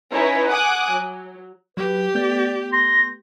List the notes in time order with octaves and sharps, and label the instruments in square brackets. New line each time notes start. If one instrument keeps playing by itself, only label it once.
[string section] C#4 D#4 E4 B4 C#5
F#5 G#5 D6 D#6 F#6
F#3
[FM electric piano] F#3 [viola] G4 [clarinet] B4
[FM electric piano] A3 B3 G6 [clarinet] D5
[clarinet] C6 [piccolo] A#6